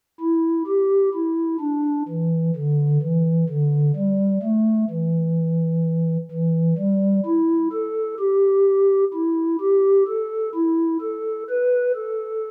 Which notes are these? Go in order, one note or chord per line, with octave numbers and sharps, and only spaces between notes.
E4
G4
E4
D4
E3
D3
E3
D3
G3
A3
E3
E3
G3
E4
A4
G4
E4
G4
A4
E4
A4
B4
A4